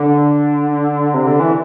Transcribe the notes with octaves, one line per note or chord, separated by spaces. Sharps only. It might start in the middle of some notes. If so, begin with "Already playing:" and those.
Already playing: D3
C3
D3
E3